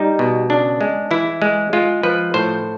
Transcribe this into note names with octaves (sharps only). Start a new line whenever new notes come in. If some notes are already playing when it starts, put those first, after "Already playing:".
Already playing: G3 D#4
B2
C#3 D4
G#3
E3 E4
G#3
G#3 F4
F3 B4
A2 C5